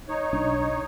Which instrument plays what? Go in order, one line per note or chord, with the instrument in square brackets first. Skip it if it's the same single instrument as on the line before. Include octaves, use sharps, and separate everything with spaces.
[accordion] D#4 C#5
[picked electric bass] B1 D4